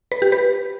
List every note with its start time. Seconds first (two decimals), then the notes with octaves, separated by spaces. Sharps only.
0.12 B4
0.22 G4
0.32 B4